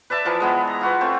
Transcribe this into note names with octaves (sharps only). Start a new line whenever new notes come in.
B4 D5 E5 A5
E3 F3 A#4
G#3 B3 E4
A#5
F4 F#4 B4
A3 C4